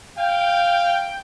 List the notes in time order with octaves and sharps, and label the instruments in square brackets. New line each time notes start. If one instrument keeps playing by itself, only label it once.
[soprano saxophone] F5 [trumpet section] G5